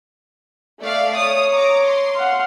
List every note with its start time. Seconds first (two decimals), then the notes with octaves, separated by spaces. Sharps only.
0.80 A3 D5 F5
1.16 C#5 D#6
1.54 A#5 D6
1.87 C6
2.16 F5 F#5